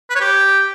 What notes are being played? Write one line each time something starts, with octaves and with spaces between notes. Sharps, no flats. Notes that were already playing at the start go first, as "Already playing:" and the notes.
B4
C#5
G4